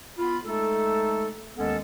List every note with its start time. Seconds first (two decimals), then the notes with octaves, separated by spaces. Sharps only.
0.18 B3 F4 B5
0.45 G#3 A3 D#4 A4
1.57 D#2 D#3 G#3 B3 C#4 A4